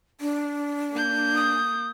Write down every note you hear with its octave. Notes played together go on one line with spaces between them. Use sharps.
D4
A#3 G6
D#6